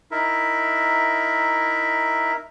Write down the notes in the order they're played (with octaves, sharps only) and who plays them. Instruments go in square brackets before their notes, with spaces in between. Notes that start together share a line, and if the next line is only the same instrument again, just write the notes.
[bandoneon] D#4 E4 A#4 E5